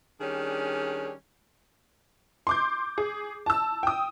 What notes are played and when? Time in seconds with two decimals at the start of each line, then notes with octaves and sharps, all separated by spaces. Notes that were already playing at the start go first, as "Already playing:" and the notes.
0.21 D#3 G3 C#4 D4 G#4
2.47 C6 D6 G6
2.98 G#4
3.46 A5 E6
3.83 G5 D#6